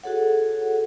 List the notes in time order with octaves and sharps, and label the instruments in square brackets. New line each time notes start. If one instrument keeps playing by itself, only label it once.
[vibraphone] F#4 G#4 A4 C#5 F#5